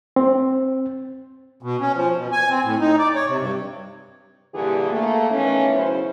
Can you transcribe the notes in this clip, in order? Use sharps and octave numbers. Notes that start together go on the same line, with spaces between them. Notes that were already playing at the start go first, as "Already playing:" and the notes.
C4
B2
C#4
F3
B2
G#5
C4
A2
D#4
D5
C#5
C3
G2
G2 A#2 D3 E3 G4 G#4
A3 A#3
D#3 E3 A3 B3 C#4
E2 C#3 F#3 C#4 E4 C5